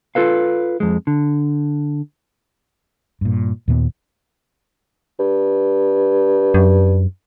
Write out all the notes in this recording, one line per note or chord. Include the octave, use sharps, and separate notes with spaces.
F4 A4 B4 F5
F2 G#3
D3
G2 A#2
D#2 A#2 G3 B3
G2
F#2